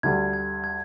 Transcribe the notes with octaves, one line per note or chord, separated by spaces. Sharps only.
D2 D3 G3 G#6
G#6
G#6